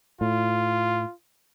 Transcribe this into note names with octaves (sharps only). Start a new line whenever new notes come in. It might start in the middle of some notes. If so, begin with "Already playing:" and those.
A2 F4